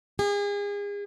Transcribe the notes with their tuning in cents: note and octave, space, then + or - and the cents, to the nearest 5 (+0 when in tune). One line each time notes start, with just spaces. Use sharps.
G#4 -35